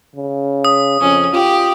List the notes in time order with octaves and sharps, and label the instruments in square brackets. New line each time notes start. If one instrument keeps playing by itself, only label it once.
[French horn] C#3
[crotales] D#6
[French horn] F2 [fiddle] C#4
[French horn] F4 [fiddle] G4